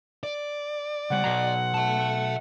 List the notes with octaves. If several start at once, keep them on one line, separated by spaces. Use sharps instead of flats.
D5
C#3 G3 F#5
B2 F#3 A#5
E5 A5